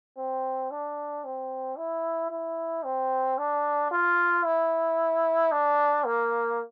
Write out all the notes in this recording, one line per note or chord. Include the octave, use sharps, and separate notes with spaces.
C4
D4
C4
E4
E4
C4
D4
F4
E4
D4
A#3